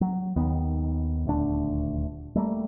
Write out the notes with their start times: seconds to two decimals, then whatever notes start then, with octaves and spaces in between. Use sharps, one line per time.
0.01 F#3
0.36 D#2 D#3 B3
1.27 D#1 D2 D4
2.35 G3 A3 A#3